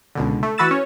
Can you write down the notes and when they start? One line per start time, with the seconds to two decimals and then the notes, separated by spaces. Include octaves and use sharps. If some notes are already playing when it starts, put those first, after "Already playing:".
0.15 C#2 B2 D3
0.43 A3
0.58 E3 F#4 B4 E6 A6 E7
0.71 C#4 C#5